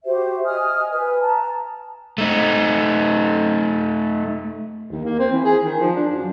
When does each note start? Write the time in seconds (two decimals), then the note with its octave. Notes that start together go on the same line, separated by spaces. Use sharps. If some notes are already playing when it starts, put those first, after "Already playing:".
0.05 F#4 G4 C5 E5
0.44 D#5 G#5 D#6 F6
0.89 B4 G#5
1.21 A5 A#5
2.18 A3 D#4
4.91 D#2
5.05 A#3
5.19 C4
5.32 E3
5.44 G#4
5.65 D#3
5.80 F3
5.95 D4
6.11 F#2